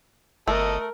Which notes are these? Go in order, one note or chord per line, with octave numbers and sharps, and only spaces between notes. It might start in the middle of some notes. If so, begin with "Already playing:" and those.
G1 A3 A4 A#4 D#5